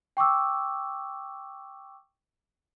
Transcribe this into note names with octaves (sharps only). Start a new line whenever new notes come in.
G5 C#6 D6 E6